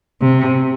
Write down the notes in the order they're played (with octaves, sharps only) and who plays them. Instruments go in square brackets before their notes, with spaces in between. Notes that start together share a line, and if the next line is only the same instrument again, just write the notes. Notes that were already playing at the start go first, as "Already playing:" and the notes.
[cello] C3